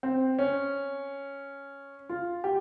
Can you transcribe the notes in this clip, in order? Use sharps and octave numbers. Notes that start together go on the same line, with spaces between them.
C4
C#4
F4
G4